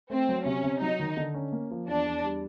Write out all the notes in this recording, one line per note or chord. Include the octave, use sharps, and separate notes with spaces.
A3 C4
F#3
C3 C#4
C3
F#3 D#4
D#3
D3
C#4
A#3
F3
E2 D4
E2
G3